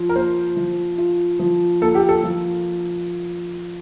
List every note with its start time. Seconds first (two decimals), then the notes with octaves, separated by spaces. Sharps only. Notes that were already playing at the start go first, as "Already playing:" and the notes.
Already playing: F3 F4
0.09 A#4
0.15 A#3 C5
0.57 F3
0.98 F4
1.39 F3
1.81 A#3 A4
1.95 G4
2.09 A4
2.23 F3